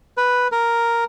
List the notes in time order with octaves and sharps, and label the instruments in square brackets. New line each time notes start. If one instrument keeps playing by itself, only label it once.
[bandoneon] B4
A#4